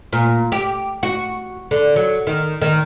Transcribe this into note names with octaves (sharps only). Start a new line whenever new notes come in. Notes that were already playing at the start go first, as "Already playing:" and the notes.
A#2
G4
F#4
D3
F#3
D#3
D#3